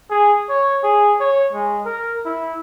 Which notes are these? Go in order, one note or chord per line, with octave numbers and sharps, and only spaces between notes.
G#4
C#5
G#4
C#5
G#3
A#4
E4